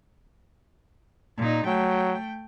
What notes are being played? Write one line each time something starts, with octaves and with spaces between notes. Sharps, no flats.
A#2 D#4
F#3 A3 G5